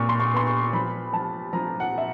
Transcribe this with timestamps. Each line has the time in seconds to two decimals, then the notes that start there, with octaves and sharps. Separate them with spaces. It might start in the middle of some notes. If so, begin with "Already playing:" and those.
Already playing: A#2 C#6
0.09 C6
0.20 C#6
0.33 B3 C6
0.47 C#6
0.73 F3 B5
1.13 F3 A5
1.53 F3 A#5
1.80 F#5
1.98 E5